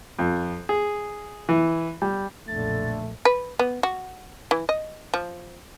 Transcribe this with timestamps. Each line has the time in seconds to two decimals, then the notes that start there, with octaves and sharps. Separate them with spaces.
0.19 F2
0.69 G#4
1.49 E3
2.02 G3
2.48 B1 F2 A#2 D3 A3 A6
3.25 B4
3.59 B3
3.83 F#4
4.51 E3
4.69 D#5
5.14 F3